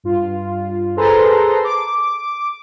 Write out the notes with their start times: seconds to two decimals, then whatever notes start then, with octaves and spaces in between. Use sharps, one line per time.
0.04 G2 F4
0.97 G#4 A4 B4 C5 A#5 C6
1.64 D6